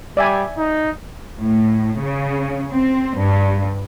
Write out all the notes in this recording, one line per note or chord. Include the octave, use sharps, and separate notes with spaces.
G3 D5 E5 G#5
D#4
A2
C#3
C4
G2